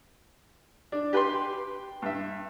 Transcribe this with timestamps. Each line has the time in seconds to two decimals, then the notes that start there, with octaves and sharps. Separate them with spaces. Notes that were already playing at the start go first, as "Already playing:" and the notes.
0.92 D4
1.13 G4 B4 G5 C6
2.02 G2 E5